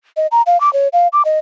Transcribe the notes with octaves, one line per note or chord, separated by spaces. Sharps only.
D#5
A#5
F5
D6
C#5
F5
D6
D#5